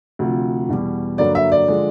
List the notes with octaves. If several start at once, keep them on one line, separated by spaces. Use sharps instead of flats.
D2 C3 F3
E2 B2 G3
G2 D3 F#3 A#3 D5
E5
D5
D3 F3 G#3